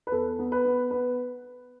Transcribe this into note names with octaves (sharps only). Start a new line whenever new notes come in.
B4
E2 A4
B3
B4
B3
B3 B4